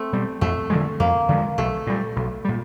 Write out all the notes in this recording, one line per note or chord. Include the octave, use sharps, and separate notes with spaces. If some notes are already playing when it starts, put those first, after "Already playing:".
Already playing: A3 C4
B2 G3
F2 A3
D3 F3 G#3
F2 A#3
D3 F3 G#3
B1 A3
A#2 G3
B1
A#2 G3